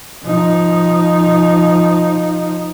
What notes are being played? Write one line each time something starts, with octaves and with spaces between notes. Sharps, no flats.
F3 D#4